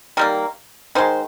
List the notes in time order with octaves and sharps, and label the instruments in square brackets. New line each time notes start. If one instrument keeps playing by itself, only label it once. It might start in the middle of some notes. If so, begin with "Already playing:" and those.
[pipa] D#3 G3 A#3 A#4
D#3 G#3 C5